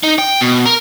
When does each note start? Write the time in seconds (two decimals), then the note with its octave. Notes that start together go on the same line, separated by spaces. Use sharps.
0.03 D#4
0.19 G5
0.40 B2
0.66 A#4